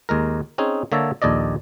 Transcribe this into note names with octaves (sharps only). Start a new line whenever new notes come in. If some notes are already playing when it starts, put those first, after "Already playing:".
D#2 G#3 A#4
C4 C#4 D#4 G#4
D3 A#3 C#5 E5 A5 A#5
A#1 D#2 A4 D5 D#5